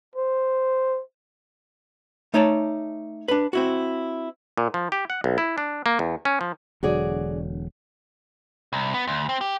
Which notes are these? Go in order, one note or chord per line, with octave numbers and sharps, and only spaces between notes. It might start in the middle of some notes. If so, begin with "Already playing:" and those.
C5
A3 D#4 C#5 D5 G#5 A5
D4 B4
C4 E4 F#4
A#2
F3
G4
F#5
B1
E4
D4
A#3
E2
C#4
F3
E1 D3 F#3 F#4 G#4 D5
C2
B3
D2
C4
G4